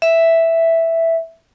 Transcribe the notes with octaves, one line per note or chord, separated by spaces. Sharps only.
E5